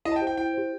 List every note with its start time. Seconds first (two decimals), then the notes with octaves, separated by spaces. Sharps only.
0.05 E4 D#5
0.12 A5
0.16 G5
0.21 G4 C5
0.27 G5
0.37 E4 G5
0.53 G4 C5